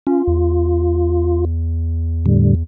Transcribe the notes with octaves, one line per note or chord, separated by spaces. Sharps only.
C#4 F4
E2
A2 D3 G3